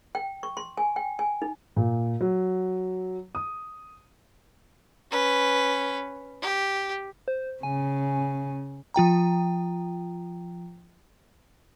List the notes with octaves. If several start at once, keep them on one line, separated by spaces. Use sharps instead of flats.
G5
C#6
C6
G#5
G5
G#5
D#4
A#2
F#3
D#6
C#4 B4
G4
C5
C#3 G#5
F3 F4 G5 A#5